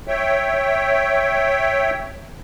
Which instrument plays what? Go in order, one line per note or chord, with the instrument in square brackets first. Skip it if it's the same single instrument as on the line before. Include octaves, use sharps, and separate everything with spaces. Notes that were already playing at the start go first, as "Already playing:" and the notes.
[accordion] C#5 E5 G5